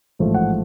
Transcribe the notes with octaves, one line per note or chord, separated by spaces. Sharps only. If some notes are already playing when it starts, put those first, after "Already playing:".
A1 G#2 F3 A3
F#5